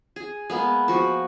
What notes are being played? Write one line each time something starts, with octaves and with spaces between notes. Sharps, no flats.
G#4
G#3 A#3 B3
F3 F#4